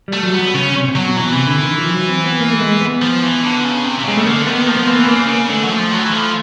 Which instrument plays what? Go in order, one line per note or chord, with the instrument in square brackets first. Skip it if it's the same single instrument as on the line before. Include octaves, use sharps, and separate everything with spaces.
[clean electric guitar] G3
[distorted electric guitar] A3
[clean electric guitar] F#3
[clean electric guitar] F#3 [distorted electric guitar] B3
[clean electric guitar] C#3 [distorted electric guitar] C#4
[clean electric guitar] C3
C3
[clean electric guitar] B2 [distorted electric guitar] F#3
[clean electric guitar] B2 [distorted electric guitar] E3
[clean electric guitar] C3
D3
D#3
F3
F#3
C4
B3
A#3
A3
G#3
B3
[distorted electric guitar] F3
E3
D3
C#3
C3
C3
[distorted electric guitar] C#3 [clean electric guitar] G#3
[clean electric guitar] A3
[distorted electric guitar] D3 [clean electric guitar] A#3
[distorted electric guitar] D#3 [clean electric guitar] B3
[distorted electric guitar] F3 [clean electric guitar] A#3
[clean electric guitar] B3
[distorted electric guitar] E3 [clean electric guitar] A#3
[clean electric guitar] B3
[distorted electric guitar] C#3 [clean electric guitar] A#3
[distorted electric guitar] C#3
[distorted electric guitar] D3 [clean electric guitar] A3
[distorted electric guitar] F#3
F3
F#3
E3
F3